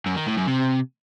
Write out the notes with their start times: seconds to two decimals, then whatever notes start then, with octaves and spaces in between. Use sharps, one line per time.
0.06 F#2
0.16 D#3
0.26 A2
0.37 F#2
0.47 C3